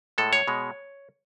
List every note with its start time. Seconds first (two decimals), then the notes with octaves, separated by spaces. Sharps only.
0.18 A2 G#3 A4
0.33 C#5
0.48 B2 G#3